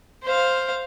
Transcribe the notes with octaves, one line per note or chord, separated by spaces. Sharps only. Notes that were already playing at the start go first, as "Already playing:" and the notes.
C5 F5